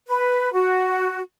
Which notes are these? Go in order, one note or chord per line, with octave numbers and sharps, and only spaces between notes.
B4
F#4